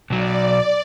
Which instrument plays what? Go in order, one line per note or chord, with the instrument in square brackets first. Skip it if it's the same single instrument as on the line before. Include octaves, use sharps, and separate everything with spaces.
[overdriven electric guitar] B1 F#3 [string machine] D5